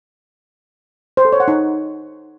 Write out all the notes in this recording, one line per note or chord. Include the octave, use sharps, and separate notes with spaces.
C5
A4
C#5
F#5
D#4